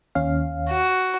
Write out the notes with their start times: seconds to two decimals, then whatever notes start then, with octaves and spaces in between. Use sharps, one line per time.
0.15 D#2 C#4 F5
0.71 F#4